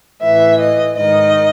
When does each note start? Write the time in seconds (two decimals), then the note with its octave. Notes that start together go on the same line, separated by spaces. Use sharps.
0.22 A2 E3 E5
0.60 D#5
0.96 G#2 D#3 D#5